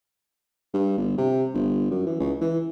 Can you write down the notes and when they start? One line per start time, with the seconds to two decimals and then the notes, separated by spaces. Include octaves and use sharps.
0.74 G2
0.97 G1
1.18 C3
1.54 G1
1.91 F#2
2.07 E3
2.20 C#2
2.41 E3